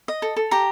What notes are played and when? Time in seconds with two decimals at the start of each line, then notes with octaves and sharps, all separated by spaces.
0.08 D#5
0.22 A4
0.36 A4
0.51 G4 A#5